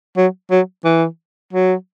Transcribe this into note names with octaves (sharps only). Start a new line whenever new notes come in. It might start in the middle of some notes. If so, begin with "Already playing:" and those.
F#3
F#3
E3
F#3